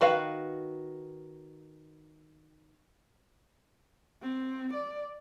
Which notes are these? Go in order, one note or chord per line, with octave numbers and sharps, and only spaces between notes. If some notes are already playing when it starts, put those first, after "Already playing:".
D#3 F#4 B4 F5
C4
D5